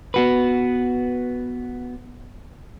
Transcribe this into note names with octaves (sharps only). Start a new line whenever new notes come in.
B3 F#4 B4